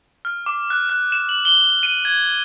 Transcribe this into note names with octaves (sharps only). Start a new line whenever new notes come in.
F6
D6
F#6
F#6
E7
F#7
G7
D#7
G#6